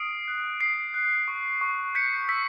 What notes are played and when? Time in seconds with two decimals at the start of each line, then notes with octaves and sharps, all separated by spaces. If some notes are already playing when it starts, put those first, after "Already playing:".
Already playing: D#6 F6 C7 D7
0.28 F#6
0.61 D#6 C7
0.94 F#6
1.28 C#6
1.61 C#6
1.95 G6 B6 C#7
2.28 E6 B6